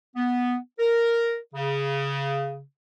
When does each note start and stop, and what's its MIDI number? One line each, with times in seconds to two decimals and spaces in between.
0.16 0.56 59
0.79 1.37 70
1.55 2.62 49